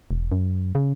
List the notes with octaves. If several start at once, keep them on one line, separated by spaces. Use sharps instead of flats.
E1
F#2
C#3